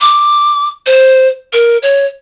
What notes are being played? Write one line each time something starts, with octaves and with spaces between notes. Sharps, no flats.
D6
C5
A#4
C#5